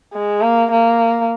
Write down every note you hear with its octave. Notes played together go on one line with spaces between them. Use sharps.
G#3
A#3
A#3